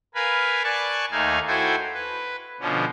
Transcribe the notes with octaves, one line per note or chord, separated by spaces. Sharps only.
A#4 B4 F5 G#5 B5
D5 G#5 A5 C#6 F#6
D#2 A3 D#4 F5 G#5
E4 F#4 A4 C5 G5 G#5
B4
B2 D3 F3 C#4